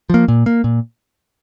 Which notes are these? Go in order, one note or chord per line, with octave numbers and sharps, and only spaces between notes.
F3 A#3
A#2
A#3
A#2